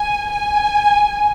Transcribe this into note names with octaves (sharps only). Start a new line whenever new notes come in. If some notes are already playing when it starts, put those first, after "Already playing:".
Already playing: G#5
G#5